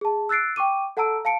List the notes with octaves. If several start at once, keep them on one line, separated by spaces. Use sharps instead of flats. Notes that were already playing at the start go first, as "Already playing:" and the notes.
G#4 A5
E6 F#6 A6 C7 D7
G5 C#6 D6 D#7
A4 F#5 A5 A#5 E6 D7
F5 A5 C#7 D7